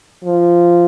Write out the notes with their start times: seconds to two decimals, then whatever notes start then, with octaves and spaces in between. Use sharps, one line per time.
0.24 F3